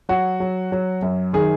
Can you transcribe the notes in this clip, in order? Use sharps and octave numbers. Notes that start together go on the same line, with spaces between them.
F#3 F#4
F#3
F#3
F#2
D#3 G#4